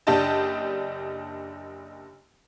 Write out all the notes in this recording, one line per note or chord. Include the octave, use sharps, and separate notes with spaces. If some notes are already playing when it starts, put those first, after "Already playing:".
F#1 D4 G4 D#5 A5